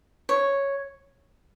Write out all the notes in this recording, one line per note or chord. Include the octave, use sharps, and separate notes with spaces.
C#5